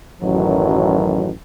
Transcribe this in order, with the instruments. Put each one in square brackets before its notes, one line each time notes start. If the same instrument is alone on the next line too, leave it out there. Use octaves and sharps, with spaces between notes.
[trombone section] A1 F#2 D#3 F#3